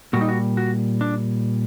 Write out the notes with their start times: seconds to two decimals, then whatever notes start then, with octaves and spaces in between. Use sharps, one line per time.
0.13 A#2 G3 F#4
0.21 D#4
0.28 F#4
0.57 F#4
1.01 D4